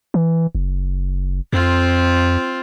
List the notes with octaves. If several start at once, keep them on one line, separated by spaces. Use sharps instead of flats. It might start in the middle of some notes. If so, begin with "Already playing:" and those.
E3
F#1
F2 C4 F4